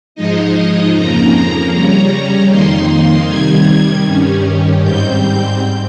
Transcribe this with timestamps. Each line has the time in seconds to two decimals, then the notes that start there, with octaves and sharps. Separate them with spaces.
0.15 G#2 F3 G#3 D#4 D#5
0.94 F2 C#3 F3 A#3 A#5
1.71 C#3 G3 C#4 A#5
2.49 F2 D#3 A#3 D#4 C6
3.26 C3 D#3 G3 G#6
4.04 G2 D#3 G3 C#4
4.82 G#2 G3 C4 G6